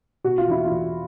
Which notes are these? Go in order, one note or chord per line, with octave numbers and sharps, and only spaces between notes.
B2 F#4
F4
E2 E4
F4
E2